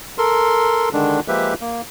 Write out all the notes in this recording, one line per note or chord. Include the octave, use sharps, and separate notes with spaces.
A4 A#4 C6
D3 D#3 G#3 D4
F3 G#3 A#3 G4 B4 E5
A#3